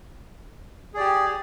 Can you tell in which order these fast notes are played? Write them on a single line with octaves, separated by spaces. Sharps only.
G#4 D5 G4